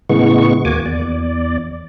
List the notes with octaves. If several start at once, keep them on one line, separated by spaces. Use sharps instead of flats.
A2 C#3 E3 G#3 B3 C#6
D#2 A#3 F#4 G#5 D6
E2 D5